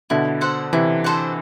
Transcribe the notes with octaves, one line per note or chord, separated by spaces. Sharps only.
B2 D3 E4
A4 C5 F#5
C3 E3 E4
A4 C5 F#5